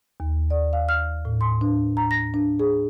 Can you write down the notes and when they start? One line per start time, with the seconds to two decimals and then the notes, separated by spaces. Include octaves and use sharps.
0.20 D#2
0.50 D5
0.73 F5
0.89 F6
1.25 A2
1.41 C6
1.61 D4
1.97 A#5
2.11 A#6
2.34 D4
2.59 G#4